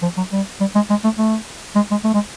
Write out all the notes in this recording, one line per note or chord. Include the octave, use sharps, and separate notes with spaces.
F3
F#3
G3
G3
G#3
G#3
A3
A3
G#3
G#3
A3
G#3